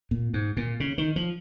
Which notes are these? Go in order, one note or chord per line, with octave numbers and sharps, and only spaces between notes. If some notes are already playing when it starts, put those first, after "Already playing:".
A#2
G#2
A#2
C#3
D#3
F3